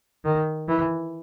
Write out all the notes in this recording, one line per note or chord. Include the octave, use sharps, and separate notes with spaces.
D#3
E3